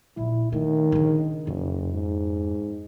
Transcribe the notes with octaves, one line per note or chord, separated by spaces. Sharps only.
A#1 E4
D#3 A3
C#3 D4
F#1 F2
G#2